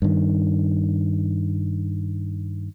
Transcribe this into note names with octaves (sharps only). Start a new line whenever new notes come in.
G2 D#3